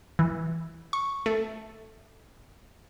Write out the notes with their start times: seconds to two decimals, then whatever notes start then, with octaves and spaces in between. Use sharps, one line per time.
0.19 E3
0.93 C#6
1.26 A3